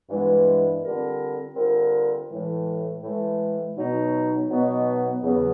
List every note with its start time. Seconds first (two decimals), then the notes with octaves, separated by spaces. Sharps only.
0.09 G2 E3 G#3 B3
0.82 D3 G3 C4 F4 A#4
1.55 D3 G3 C4 F4 A#4
2.29 A2 E3 G#3
3.03 A2 E3 G#3
3.76 B2 F#3 B3 D#4
4.49 B2 F#3 B3 D#4
5.22 E2 C#3 F#3 B3